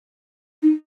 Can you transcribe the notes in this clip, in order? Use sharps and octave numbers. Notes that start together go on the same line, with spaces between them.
D#4